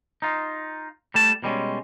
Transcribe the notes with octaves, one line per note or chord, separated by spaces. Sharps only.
D#4 F4
G3 A3 A5
B2 G3 G#3 C#4